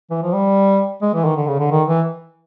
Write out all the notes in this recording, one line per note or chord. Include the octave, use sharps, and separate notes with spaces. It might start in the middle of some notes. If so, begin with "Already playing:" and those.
E3
F3
G3
G#3
E3
D#3
D3
C#3
D3
D#3
E3